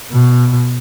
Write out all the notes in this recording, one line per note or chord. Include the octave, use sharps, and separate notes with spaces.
B2